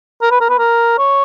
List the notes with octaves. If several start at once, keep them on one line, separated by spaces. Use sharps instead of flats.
A#4
B4
A#4
B4
A#4
C#5